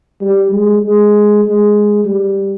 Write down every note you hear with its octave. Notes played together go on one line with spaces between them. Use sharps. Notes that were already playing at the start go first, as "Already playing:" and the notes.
G3
G#3
G#3
G#3
G3